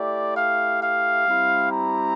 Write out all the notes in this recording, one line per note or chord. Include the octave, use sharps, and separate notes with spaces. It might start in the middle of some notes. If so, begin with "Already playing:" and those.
Already playing: A3 E4 G4 D5
F5
F5
G3 C4 E4 G4
A#5